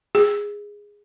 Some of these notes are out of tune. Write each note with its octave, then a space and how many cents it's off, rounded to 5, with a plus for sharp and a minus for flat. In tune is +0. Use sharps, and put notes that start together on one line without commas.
G#4 -10